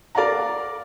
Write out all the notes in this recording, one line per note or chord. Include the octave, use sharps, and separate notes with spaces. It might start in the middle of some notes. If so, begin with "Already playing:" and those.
A#4 D5 F5 F#5 A#5